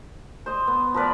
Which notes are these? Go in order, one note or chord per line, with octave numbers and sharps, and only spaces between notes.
C5 D#5
B3
F3 A#4 B4 D5